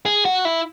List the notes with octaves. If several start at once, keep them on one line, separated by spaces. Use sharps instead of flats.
G#4
F#4
E4